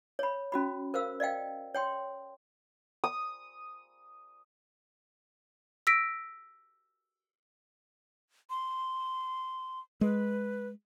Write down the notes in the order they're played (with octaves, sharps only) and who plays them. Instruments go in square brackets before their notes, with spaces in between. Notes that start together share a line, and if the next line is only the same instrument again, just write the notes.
[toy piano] C#5 B5
C#4 F#4 B5
A#4 C5 F5 E6
D5 D#5 F5 G5
C#5 G5 C6
[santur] D#6
[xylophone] E6 A#6 B6 D7
[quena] C6
[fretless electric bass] G#3 [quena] B4